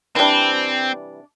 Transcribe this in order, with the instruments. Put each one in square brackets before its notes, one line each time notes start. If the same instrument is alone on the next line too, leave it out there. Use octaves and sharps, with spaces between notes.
[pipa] C3 E3 G3 D4 [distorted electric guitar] C4